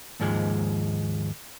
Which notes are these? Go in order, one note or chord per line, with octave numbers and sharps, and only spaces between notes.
D#2 G#2 F3 G#3